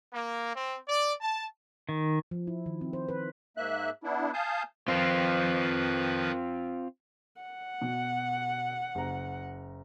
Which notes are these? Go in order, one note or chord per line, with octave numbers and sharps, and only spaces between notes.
A#3
C4
D5
A5
D#3
F3
E4
D#3
C4
C5
B4
G#2 A#3 E5 F#6
B3 D4 E4
F5 G#5 A5 D#6 G6
D#3 F3 C4 F4 B4
F#5
B2
F#1 A#5